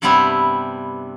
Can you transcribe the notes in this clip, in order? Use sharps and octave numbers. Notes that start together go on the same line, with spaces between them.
G2 C3 G3 B3 C4 E4